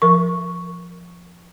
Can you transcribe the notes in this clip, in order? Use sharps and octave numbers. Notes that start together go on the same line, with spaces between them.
F3 A#4 C#6